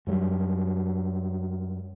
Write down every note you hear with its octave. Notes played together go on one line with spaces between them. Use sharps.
F#2 F#3 G3